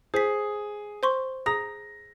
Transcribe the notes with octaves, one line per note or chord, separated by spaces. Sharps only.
G#4 C5 B6
C5 C6 C#6
G#4 A#5 D#6 A#6